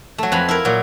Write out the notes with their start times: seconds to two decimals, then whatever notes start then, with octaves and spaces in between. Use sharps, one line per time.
0.18 F#3 A3
0.32 F2 B4 G#5 A#5 B5
0.49 E4 A#4
0.65 A#2 F#3